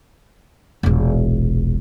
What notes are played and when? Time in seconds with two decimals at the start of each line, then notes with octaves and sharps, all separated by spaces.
0.83 E1 A#1